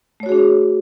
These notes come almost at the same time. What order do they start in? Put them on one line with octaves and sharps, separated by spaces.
A3 C#5 F#4 G#4 D4